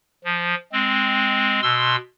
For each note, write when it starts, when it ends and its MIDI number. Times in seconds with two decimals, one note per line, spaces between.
0.24 0.54 53
0.73 1.60 56
0.73 1.60 60
1.62 1.96 47
1.62 1.96 84
1.62 1.96 88